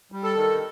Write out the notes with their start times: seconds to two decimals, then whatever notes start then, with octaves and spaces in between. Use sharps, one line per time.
0.12 G3
0.23 A4
0.36 D#3